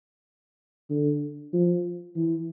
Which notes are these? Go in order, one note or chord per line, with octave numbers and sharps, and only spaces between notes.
D3
F3
E3